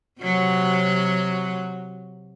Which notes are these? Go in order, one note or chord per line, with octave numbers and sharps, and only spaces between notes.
C3 F#3 F#4